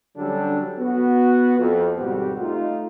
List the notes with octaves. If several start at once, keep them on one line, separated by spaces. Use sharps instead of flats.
D3 F#3 G3 C#4 D4 A4
B3 F#4
F2
G#1 B2 G3 C4 F#4 G4
A3 D#4 F4